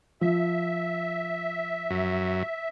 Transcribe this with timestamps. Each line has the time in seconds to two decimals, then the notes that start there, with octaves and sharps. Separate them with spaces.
0.21 F3 E5
1.90 F#2